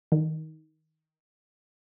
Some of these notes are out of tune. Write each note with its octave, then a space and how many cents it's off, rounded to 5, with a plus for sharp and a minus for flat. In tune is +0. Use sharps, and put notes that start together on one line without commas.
D#3 +15